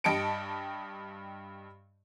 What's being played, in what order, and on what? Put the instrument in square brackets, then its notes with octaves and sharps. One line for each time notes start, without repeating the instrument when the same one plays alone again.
[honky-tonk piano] G2 G4 D#5 A5 C#7 D7